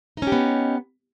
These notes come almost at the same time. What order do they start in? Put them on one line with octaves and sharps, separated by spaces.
D#4 C#4 G4 B3